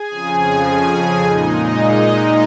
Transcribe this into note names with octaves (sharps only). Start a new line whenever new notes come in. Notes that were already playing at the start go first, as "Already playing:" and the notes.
Already playing: G#4 G#5
F2 C#3 F3
A#2 G#3 D#4 D#5